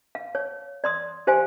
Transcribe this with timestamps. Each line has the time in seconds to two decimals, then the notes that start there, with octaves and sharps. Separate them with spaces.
0.15 F5
0.35 C#5
0.84 D5 C6 D#6
1.27 G4 C5 F5 G#5 C6